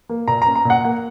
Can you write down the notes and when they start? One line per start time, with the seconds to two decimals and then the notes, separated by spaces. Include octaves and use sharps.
0.09 A#3
0.28 A#2 A#5
0.42 A#5
0.47 C#4
0.56 A#5
0.65 A#2 F#5
0.84 A#3 F#5